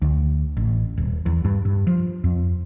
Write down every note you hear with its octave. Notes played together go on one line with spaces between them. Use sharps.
D2
A1
D#1
E2
G2
G2
F3
F2